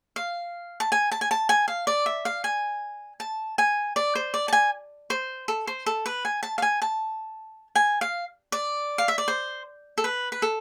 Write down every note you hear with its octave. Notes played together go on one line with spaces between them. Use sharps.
F5
A5
G#5
A5
G#5
A5
G#5
F5
D5
E5
F5
G#5
A5
G#5
D5
C5
D5
A5
G#5
C5
A4
C5
A4
B4
G#5
A5
F5
G#5
A5
G#5
F5
D5
F5
E5
D5
C5
A4
B4
B4
A4